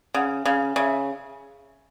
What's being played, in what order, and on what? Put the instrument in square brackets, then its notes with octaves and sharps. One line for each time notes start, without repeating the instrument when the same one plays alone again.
[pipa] C#3 [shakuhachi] F#5
[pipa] C#3 [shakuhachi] F5
[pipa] C#3 [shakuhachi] E5